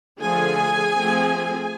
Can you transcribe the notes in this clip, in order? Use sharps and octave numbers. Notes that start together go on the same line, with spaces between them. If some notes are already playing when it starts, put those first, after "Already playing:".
D3 F3 A3 G#4 G#5
F3 A3 C4